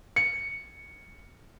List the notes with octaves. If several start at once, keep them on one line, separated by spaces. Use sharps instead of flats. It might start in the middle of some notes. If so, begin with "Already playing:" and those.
C#7